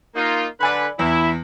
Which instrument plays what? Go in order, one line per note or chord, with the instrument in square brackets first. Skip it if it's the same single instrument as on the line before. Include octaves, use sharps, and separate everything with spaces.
[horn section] A#3 D#4 F4
[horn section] D3 B4 [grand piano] D5 G#5 B5
[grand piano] E2 [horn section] E4